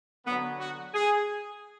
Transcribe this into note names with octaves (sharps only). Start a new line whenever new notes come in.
D3 F#3 B3
F#4
G#4